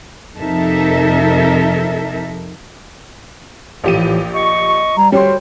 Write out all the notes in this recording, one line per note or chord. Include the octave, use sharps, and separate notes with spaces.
F2 C3 D#4 A4 A#4 E5
A#1 A2 E3 G4 D#7
D#5 C#6
G3 A#5
D2 G3 F#4 C#5 G5 C6